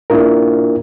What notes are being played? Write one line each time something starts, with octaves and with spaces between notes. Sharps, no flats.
A#3 D4 E4 F4 A#4